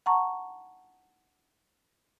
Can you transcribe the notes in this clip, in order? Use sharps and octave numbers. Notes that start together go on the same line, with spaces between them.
F#5 A5 A#5 C#6